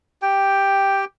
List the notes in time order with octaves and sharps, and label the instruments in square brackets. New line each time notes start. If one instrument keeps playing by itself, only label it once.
[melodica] G4 G5